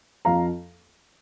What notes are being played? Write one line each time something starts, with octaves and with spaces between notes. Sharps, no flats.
F2 F3 F5 A#5